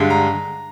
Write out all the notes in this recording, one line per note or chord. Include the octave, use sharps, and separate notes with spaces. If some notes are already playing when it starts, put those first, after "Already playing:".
Already playing: G2 D3 G#3
A#5